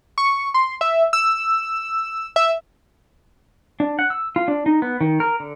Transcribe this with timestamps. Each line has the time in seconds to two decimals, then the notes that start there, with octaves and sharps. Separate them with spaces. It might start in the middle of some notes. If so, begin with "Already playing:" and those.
0.18 C#6
0.54 C6
0.81 E5
1.13 E6
2.36 E5
3.80 D4
3.99 F#5
4.10 E6
4.36 F4
4.48 D4
4.66 D#4
4.82 B3
5.01 D#3
5.20 A#4
5.40 D3